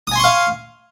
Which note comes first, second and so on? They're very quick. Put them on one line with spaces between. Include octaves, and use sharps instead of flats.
D#6 G#5 C6 C#6 F5